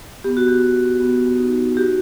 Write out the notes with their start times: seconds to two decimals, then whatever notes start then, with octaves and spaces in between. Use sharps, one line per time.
0.24 B3 G4
0.37 F#4
0.48 G4
0.63 B3
1.00 B3
1.39 D#4
1.77 F#4 G4